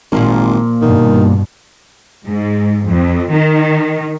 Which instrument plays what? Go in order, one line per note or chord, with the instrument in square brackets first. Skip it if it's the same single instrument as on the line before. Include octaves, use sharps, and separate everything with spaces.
[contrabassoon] G#1 [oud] A#2 F3 A#3
[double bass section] G2 B2 [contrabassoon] D#3
[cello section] G#2
F2
D#3